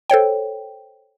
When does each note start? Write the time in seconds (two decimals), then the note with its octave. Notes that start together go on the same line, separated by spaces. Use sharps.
0.10 A4 C5 C#5 G5